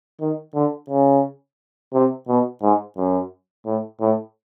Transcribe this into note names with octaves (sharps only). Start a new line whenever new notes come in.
D#3
D3
C#3
C3
B2
G#2
F#2
A2
A2